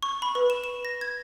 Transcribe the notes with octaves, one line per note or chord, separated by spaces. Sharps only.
C#6
B5
B4
E7
E7
A#6
G#6